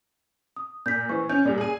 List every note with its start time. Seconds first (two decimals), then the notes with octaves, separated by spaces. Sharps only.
0.56 D#6
0.86 A#2 G6 B6
1.09 E3 C5 C#6
1.29 C#4 G6
1.45 A#2 G3 D5
1.58 G#4 G#5